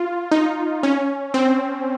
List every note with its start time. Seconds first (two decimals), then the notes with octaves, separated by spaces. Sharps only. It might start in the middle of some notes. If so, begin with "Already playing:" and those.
Already playing: F4
0.31 D#4
0.83 C#4
1.34 C4